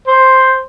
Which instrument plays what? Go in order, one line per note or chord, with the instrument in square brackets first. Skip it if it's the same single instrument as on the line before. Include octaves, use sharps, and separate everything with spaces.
[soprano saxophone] C5